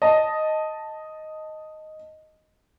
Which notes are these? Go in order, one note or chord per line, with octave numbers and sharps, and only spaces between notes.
D#5 A5